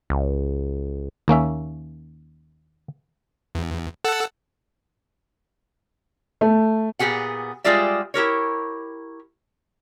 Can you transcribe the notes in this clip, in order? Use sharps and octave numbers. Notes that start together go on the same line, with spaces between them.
C#2
D#2 A#3 C#4 E5
E2
A4 F#5 E6
A3
A#2 B3 G4 G#4 F#5
G3 G#3 F4 G#4 D5 E5
E4 G4 A#4 C#5